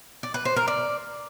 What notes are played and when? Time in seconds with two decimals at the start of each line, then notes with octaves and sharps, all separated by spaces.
0.23 D5
0.34 B4
0.45 C5
0.56 A#4
0.68 D5